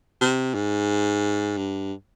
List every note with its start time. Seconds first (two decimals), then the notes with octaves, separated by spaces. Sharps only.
0.21 C3
0.55 G#2
1.57 G2